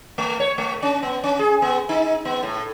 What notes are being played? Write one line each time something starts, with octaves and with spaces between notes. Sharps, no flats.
A3
C#5
A3
C#4
B3
C#4
G#4
B3
D#4
B3
A2